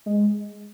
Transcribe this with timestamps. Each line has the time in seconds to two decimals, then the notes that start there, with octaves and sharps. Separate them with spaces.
0.06 G#3